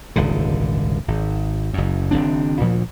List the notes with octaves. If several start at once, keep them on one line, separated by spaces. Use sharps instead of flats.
D#1 G#1 C#2 D3
G#1
F#1 F#2
F#1 D#3 C4 D4
D2 A#2 F3